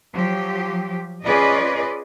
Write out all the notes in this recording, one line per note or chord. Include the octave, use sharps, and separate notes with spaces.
F3 F#3 G4
C#4 F4 G#4 B4 D5 D#5